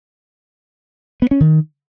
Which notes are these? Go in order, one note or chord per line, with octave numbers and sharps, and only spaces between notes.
B3
C#4
D#3